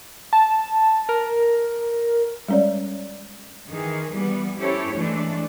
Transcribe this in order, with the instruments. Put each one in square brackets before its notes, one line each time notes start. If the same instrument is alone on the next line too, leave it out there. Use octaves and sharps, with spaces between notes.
[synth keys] A5
A#4
[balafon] G3 G#3 C#4 C#5 D5
[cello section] D#3 E3 G#4
E3 G3 B3
C#4 E4 G4 A4 C5 C#5
E3 G#3 A3 D4